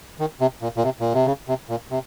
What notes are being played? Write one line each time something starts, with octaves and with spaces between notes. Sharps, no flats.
D#3
C3
A#2
A#2
C3
A#2
C3
C#3
C3
A#2
C3